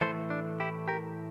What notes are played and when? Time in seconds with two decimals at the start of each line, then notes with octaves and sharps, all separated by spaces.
0.01 A2 E3 A3 A4 C5
0.30 D4
0.60 E4 G4
0.88 G4 A#4